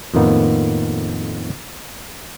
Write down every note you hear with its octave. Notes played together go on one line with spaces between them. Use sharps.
F2 A2 D#3 A#3 B3